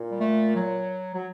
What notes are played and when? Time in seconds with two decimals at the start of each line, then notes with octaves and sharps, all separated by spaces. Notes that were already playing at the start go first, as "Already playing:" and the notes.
Already playing: A#2
0.11 G3
0.20 A3
0.55 F#3
1.14 F#3